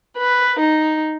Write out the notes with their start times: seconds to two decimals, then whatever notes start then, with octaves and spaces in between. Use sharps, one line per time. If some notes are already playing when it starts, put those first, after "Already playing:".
0.16 B4
0.58 D#4